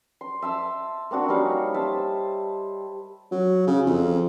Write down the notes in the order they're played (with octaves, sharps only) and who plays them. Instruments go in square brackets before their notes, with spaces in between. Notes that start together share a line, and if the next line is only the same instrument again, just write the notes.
[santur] C6
E5 A5 C6 E6
A#3 C4 D4 F#4
G3 C#4 D#4 F5
C5 E5 A5
[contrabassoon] F#3
C#3
F2